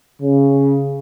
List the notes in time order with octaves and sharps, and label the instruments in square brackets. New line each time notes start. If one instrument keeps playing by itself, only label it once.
[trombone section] C#3